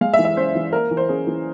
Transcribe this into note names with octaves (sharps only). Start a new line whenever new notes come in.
G#3 F5
E5
E3
E5
C#4 C5
E3
A#3 A#4
E3
C5
C#4 G#4
E3